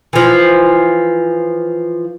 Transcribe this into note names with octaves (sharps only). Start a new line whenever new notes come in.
E3 F3